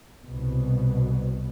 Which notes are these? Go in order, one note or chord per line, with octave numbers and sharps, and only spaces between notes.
C2 B2